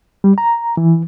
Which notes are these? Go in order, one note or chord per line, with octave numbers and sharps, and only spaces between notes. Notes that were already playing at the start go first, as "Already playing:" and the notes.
G3
A#5
E3